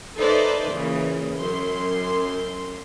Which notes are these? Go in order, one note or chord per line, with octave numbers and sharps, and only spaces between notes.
D#4 A4 B4 C5 D5 E5
A#2 C#3 E3
F#2 C6